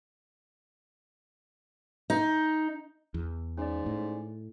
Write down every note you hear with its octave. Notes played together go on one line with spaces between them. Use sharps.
D#4
E2
G#2 C#4 D5
A2